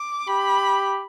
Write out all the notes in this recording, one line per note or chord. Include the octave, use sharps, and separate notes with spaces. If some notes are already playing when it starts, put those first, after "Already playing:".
Already playing: D6
G4 B5